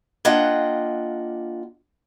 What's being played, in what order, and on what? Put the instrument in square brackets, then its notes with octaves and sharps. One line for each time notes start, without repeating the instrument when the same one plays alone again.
[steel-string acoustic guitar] A#3 D4 F4 D#5 F#5 G5